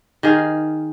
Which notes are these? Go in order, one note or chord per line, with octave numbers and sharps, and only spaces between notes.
D#3 G#4 F5